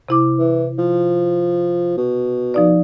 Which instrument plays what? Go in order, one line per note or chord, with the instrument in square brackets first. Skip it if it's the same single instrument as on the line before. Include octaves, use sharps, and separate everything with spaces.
[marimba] C3 E4 D6
[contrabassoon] E3
F3
B2
[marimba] F3 D#4 D5